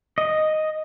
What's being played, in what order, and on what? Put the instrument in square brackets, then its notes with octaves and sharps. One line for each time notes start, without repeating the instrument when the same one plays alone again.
[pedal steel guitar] D#5